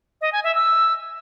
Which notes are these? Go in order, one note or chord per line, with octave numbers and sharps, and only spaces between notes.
D#5
G#5
E5
E6